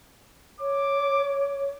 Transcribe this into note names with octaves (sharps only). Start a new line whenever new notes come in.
C#5 D6